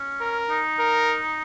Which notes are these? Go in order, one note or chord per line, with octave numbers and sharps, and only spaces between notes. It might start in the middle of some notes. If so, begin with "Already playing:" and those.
Already playing: C#4
A#4
D#4
A#4